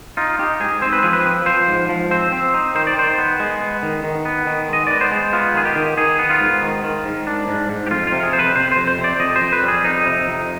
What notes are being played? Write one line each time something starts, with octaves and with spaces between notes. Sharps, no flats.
D#4 F4
D#4 G4
G#2 G#4
C4 C5
B4
F3 G#4
B4
C4
F3 C5
G#2
F3
C4 C5
C4
D#4
D#3 C5
D5
D#3 C5
B3
G#3
B3
D#3
D#3
B3
D#3
G#3 D#5
B3 D5
C5
G#3
B3 F4
D#3 G#4
G4
D#3
D#3 G#4
B3
F4
G#2
D#3
D#3
G#2
D4
G#2
G#2
G4
F2 F4
F4
C3
G#4
F2 C5
B4
C3 C5
C5
F2
C5
C3
D5
F2 D#5
C5
F2
B4
G3
G#4
F2 D#4
C3
F2